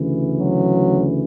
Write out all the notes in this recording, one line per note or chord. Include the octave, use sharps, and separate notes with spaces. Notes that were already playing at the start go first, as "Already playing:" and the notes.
Already playing: D2 C#3 E3
F#3